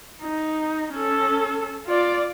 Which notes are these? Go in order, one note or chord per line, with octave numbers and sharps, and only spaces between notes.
D#4
C#4 A4
F4 D5